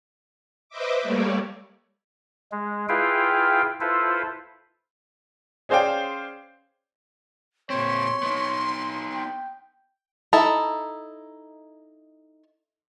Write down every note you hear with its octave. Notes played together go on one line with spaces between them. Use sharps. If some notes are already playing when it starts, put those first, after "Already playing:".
B4 C5 D#5 E5 D6
G3 A3 A#3 C#5 D5
G#3
E4 F4 G#4 B4 F5 G5
E4 F4 A4 B4 C5
C#4 G#4 C5 D5 F5 G5
A#2 C4 C#5 C6
B3 D#4
G5
D#4 E4 A4